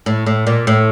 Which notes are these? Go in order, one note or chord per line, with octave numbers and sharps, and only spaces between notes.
A2
A2
A#2
A2